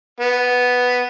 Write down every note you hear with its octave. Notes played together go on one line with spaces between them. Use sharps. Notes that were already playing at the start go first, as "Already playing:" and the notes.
B3